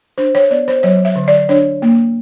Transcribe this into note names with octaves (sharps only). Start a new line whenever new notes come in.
D4 C5
C#5
B3 D5
C5
F#3 C#5
E5
D3
D5
D4 C#5
A#3